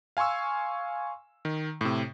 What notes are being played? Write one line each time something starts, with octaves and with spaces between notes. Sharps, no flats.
F5 G#5 C6 C#6 E6
D#3
A2 C3